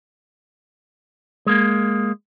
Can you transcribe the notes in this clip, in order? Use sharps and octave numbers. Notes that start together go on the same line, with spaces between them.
G#3 A#3